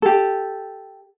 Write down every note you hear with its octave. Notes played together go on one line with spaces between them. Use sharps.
G4 A4